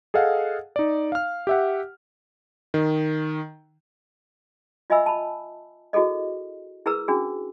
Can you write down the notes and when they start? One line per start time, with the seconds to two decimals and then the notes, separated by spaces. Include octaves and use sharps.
0.14 G#4 A4 D#5 F5 F#5
0.76 D#4 D5
1.12 F5 F6
1.47 G4 E5 F#5
2.74 D#3
4.90 F4 D#5 E5 G#5 B5 E6
5.06 A5 B5
5.93 E4 F#4 G#4 A4 D#5
6.86 E4 G#4 A#4 B4 A#5 E6
7.08 C#4 D4 F#4 G#4